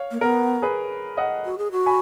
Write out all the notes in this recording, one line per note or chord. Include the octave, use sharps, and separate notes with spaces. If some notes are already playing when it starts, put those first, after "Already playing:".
Already playing: C#5 F5
A#3
B3 A#4
G#4 B4
D#5 F#5
F#4
G#4
F#4
G#5 B5